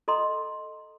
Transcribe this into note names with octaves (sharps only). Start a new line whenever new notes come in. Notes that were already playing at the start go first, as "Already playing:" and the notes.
A4 D#5 A#5 C6